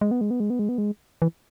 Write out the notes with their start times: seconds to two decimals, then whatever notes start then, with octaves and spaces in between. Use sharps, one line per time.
0.01 G#3
0.11 B3
0.21 G#3
0.31 B3
0.40 G#3
0.50 B3
0.59 G#3
0.69 B3
0.78 G#3
1.22 E3